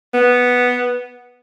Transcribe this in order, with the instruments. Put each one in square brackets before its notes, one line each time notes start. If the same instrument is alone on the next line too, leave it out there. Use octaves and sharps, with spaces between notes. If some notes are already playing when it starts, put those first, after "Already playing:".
[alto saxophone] B3